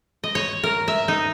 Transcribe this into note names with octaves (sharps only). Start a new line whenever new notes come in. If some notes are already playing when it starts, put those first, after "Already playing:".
D#5
C#5
A#4
E5
D#4